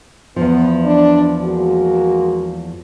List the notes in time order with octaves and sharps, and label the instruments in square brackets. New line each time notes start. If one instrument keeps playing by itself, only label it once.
[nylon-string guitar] E2 F3 [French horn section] B3
[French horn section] D4 D5
G#3 A#3 F#4